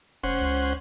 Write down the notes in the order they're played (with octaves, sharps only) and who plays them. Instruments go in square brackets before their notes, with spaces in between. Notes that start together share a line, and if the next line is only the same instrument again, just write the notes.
[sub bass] F1 [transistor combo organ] C#4 C5 F#5
[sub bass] C#2